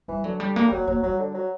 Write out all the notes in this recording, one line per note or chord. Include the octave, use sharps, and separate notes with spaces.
E3 G3
D3 F#3
G3
A#3
G3
F#3 A#3
F#3 A#3
F#3 G3
D3
F#3